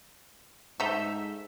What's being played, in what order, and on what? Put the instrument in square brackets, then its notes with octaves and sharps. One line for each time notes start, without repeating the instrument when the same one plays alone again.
[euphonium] G#2 [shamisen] A3 D#4 [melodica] E5 [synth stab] E6 G6 B6